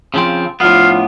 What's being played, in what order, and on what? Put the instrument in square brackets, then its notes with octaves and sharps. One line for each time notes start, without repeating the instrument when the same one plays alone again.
[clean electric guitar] C#3 F3 C4
[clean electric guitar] A2 B3 [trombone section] F3 D4 F4 [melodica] F5